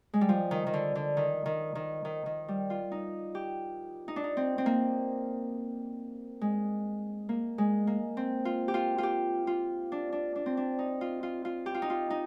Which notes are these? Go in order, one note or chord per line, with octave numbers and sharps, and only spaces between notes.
G#3
G3
F3
D#3
D#3
D3
D3
D#3
D#3
D#3
D#3
D#3
G3
F4
D#4
G4
D#4
D4
D#4
C4
C4
A#3
G#3
A#3
G#3
A#3
C4
F4
G4
F4
F4 G4
F4
D4
D4
D4
C4
D4
D#4
F4
F4
F4
G4
F4
D#4
F4
D#4